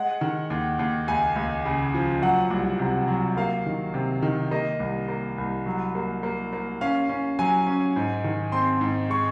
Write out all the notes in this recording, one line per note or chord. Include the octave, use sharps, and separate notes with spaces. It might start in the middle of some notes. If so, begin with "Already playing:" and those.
Already playing: G#3 F#5
D#3
D#2
D#2
C#2 G#5
C#2
C#3
F3
F#3 F#5
C2
C3
F#3
A#3 F5
D#3
C3
D#3
A#3 D#5
C2
A#3
C2
F#3
A#3
A#3
A#3
C#4 F5
C#4
F#3 G#5
C#4
G#2
D#3
C4 C6
G#2
G#3 C#6